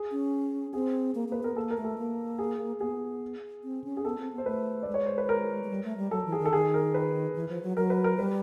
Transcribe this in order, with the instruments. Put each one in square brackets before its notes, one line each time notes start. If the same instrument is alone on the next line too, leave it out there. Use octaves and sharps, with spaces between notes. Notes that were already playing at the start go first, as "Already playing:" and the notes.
Already playing: [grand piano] G#4
[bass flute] C#4
[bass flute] C4 [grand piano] G#4
[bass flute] A#3
[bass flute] A#3 [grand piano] B4
[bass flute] B3 [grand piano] A#4
[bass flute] A#3 [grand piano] A4
[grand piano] A#4
[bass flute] A3
[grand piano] A4
[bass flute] A#3
[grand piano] G#4
[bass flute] B3 [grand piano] G#4
[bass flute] C4
C#4
[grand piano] G#4
[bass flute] B3 [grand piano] A4
[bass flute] C4
B3
[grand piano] C5
[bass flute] A3 [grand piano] B4
[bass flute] G#3 [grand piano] D5
[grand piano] C#5
C5
B4
A#4
[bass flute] G#3
G3
A3
G3
[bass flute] F#3 [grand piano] A4
[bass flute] E3
[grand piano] G#4
[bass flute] D#3
[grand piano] A4
[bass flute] D#3 [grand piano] G#4
[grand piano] A#4
B4
[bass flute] E3
F3
F#3
[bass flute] F#3 [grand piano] A#4
[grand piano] B4
A#4
[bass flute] G3 [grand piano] B4